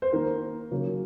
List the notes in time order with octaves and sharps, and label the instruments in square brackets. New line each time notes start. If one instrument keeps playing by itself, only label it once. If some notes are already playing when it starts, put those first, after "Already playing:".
[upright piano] C5
D#3 A#3 A#4
C#3 F#3 A#3